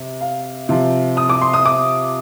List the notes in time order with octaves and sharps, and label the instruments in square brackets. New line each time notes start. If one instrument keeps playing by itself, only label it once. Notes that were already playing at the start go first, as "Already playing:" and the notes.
Already playing: [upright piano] C3
F5
C3 F3
D#6
D6
C6
D#6
D6